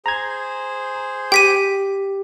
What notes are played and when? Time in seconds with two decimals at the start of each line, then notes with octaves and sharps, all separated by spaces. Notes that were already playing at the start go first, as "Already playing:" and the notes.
0.06 G#4 C5 A#5 G#6
1.32 G4 G5 B6 D#7